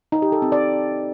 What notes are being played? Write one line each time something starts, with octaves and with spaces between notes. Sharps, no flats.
D#4
G4
A4
C4
D5